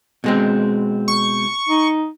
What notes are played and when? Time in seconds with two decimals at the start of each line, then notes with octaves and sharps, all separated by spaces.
0.24 B2 G#3 C4
1.08 C#6
1.69 D#4